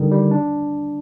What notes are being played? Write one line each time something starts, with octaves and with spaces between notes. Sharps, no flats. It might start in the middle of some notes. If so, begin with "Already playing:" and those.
Already playing: D3 D#3 G3
G3
D4